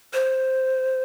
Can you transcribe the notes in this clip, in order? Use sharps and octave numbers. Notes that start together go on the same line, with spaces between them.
C5